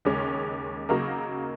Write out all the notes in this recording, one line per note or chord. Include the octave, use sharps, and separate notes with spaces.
D#2 C#3 G#3 C#4
C#3 F#3 A#3 D#4 A#4